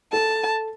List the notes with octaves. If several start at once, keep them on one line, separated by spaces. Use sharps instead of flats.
A4 A5